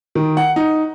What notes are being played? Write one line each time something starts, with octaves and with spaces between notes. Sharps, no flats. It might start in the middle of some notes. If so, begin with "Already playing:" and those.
D#3
F#5
D#4